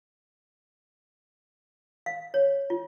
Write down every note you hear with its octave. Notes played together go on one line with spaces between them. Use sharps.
F5
C#5
F4